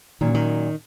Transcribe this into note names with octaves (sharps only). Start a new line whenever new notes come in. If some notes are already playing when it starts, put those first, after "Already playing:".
A#2 D#3 F#3 C#4
D#3